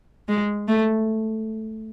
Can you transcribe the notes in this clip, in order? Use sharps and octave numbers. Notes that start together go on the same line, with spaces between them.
G#3
A3